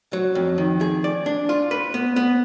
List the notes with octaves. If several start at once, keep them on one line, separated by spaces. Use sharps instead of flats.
F#3
F2
D#3
G#4
D5
D4
F4
B4
B3
B3